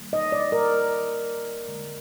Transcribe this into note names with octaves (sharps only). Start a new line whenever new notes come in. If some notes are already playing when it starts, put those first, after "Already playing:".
Already playing: D#3 G3 A#3
D#5
D5
A#4
D3 G#3